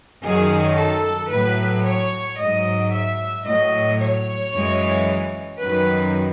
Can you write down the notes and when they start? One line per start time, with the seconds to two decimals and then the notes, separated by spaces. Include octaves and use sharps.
0.23 F#2 D#3 F#3 G#4
0.77 A4
1.30 A2 F#3 B4
1.85 C#5
2.38 G#2 F#3 D#5
2.92 E5
3.47 A2 F#3 D#5
4.00 C#5
4.54 F#2 E3 G#3
5.61 F#2 D#3 F#3 B4